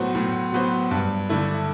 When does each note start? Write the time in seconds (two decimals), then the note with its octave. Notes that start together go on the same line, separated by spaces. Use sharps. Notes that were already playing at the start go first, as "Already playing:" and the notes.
Already playing: A2 F#3 B3 F#4 C5
0.15 A2
0.53 F#3 B3 F#4 C5
0.91 G2
1.29 D3 A3 E4